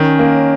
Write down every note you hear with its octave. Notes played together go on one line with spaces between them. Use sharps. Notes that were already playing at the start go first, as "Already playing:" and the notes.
Already playing: D#3 C#4
A#3